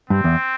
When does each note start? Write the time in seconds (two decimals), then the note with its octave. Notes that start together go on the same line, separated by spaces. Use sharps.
0.10 G2 C4
0.24 E2